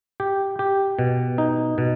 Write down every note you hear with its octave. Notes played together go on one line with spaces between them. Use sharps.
G4
G4
B2
D#4
B2